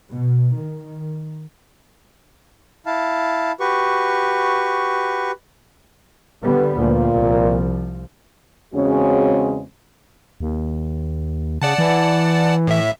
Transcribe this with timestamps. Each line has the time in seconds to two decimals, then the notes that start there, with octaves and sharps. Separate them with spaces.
0.10 B2
0.54 D#3
2.86 E4 F5 A5
3.60 F#4 G4 B4 C#6
6.42 D3 G3 B3
6.78 D2 A#2 F3
7.16 C2 F3
8.74 E2 C#3 G#3 C4 C#4 F#4
10.40 D#2
11.62 C#3 D5 F#5 A5
11.78 E3
12.67 A2 E5